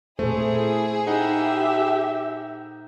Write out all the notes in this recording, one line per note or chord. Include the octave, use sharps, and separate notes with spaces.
A#2 A3 E4 G#4 A4 C5
D#4 G4 E5 F#5